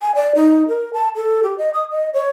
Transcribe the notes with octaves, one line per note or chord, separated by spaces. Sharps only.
G#5
D5
D#4
A#4
A5
A4
G4
D#5
D#6
D#5
C#5